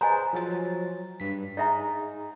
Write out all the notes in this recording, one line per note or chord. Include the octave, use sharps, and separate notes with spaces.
G#4 B4 C5 D#5 G#5 A#5
F3 F#3 A6
G2 B6
D#4 G#4 D#5 E5 A#5